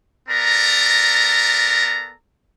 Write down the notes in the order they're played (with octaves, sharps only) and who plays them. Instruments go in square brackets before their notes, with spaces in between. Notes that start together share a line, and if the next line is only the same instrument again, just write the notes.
[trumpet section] B3 A4 A#4 D5 A#5